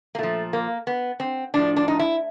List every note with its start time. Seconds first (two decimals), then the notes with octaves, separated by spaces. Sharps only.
0.15 A#3
0.18 A#2 F3 A3
0.53 A#3
0.87 B3
1.20 C4
1.54 A2 F3 D4
1.76 D4
1.88 D#4
1.99 E4